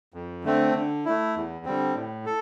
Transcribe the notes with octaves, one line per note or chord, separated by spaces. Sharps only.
F2
D3 A3 C4
D3
A3 E4
E2
D3 G3 C4
A2
A4